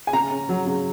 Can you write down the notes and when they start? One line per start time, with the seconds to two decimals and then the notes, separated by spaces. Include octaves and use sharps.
0.07 G#5
0.13 C#3 A#5
0.31 C#4
0.49 F#3
0.67 C#3